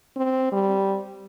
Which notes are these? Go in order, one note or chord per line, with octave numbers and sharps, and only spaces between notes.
C4
G3